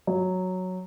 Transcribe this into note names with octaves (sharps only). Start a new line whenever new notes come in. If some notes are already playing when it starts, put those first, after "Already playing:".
F#3